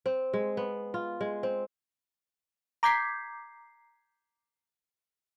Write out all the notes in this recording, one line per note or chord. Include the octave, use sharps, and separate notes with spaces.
C4
G#3
B3
F4
G#3
C4
A#5 D6 G6 G#6 B6 C7